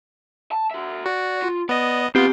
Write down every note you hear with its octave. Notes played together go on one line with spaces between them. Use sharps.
A5
F#4 E5
F#4 D5
F4
B3 D5 D#5
E2 B3 C4 F4 G4